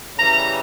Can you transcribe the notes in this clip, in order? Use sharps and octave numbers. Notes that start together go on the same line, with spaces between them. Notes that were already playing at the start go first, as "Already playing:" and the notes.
C#3 E3 G3 A#5